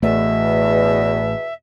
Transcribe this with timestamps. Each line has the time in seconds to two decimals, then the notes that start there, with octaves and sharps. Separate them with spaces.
0.02 A1 E2 B2 A3 E5